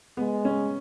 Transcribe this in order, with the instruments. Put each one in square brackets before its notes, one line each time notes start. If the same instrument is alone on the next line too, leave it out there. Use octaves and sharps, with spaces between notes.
[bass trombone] G#3 [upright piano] B3
[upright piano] C#4